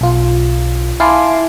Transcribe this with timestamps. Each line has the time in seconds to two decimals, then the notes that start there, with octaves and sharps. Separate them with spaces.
0.01 B1 F4
1.00 E4 F5 G#5 A5 C6 D6